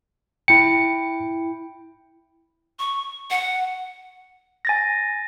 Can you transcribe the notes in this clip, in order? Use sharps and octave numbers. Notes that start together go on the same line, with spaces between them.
E4 G5 C#7
C#6
F#5
G#5 A6 A#6